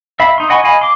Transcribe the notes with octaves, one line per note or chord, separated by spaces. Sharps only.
E5 F5 B5
D#4 C6
D#5 F#5 G#5 B5 C#6
D#5 F5 G#5 B5
C6 D6